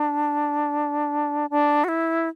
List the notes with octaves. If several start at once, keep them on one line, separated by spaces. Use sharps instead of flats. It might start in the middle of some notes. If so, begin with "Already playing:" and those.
Already playing: D4
D4
F#4
E4